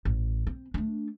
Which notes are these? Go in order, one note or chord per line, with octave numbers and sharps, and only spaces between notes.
A1
C4
A3 D4